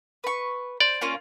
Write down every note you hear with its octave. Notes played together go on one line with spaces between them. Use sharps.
B4 C#6
C5 D5
A#3 C#4 F4